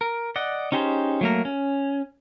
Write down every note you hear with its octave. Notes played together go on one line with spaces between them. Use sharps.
A#4
D5 D#5 F#5
C#4 D#4 G4 G#4 C5
F#3 A3 A#3 A#4
C#4